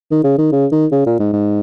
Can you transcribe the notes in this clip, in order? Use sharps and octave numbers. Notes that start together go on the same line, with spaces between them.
D#3
C#3
D#3
C#3
D#3
C#3
A#2
G#2
G#2